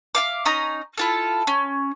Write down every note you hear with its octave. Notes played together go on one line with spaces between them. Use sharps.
E5 F5 D6
C#4 D#4 A#5 D#6
E4 F4 A4
C#4